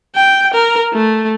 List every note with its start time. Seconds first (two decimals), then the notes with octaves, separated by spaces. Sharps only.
0.16 G5
0.53 A#4
0.93 A3